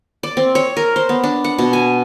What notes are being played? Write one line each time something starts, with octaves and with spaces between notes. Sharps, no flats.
D5
C4
C#5
A#4
C5
B3
D4
F#5
B2
G#5